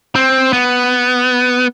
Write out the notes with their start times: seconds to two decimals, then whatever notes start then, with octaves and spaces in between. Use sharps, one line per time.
0.15 C4
0.53 B3